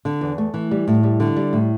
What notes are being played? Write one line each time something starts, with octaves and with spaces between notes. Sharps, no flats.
D3
E2
A3
E3
G3
A2
G3
D3
G3
A2